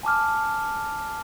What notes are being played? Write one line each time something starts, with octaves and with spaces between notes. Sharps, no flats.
G#5 A5 D6 F6